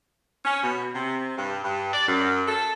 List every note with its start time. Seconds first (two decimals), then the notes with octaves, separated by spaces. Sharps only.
0.45 C#4
0.63 B2
0.93 C3
1.36 G2
1.63 G2
1.93 D5
2.07 F#2
2.47 A4